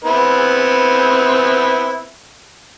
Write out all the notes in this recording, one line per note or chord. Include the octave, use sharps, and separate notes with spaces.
B3 C4 E4